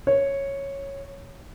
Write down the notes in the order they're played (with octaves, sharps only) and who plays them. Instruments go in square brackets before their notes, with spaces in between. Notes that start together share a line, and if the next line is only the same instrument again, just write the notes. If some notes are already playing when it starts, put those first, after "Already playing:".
[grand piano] C#5